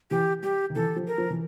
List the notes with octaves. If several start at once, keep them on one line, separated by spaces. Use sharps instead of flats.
E3 G4
G3 G4
D#3
E3 A4
F3
A#4
F3
E3